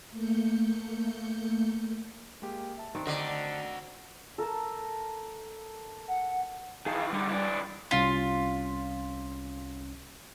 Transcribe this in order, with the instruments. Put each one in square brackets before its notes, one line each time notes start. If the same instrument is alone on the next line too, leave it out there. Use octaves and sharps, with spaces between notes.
[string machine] A3 A#3 G6 C#7
[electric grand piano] G#3 A#3 G4
E5 A5
[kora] D#3 C4 D4
[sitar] D3 [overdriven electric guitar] F#4 D5 [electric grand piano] D#5
[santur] A4 A#4 A5
[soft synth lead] F#5
[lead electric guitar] D#3 E3 [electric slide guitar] G#4 F5 A5
[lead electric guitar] D3 D#3 [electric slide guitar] G3
[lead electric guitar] E3 D4
[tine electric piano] C2 C#4 B6 [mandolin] F4